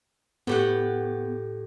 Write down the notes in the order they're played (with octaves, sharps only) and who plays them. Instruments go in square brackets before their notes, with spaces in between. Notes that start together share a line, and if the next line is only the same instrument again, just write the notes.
[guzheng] A2 G4 F#5 [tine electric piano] B3